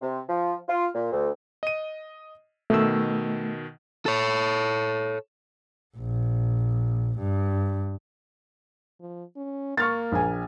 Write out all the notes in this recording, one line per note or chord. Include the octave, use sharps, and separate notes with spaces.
C3
F3
F4
A#2
D2
D#5 D#7
B2 D#3 A3 E6
A4 C#5
A#1
G2
F3
C#4
A#3 C#6 F6 A6
A#1 G#5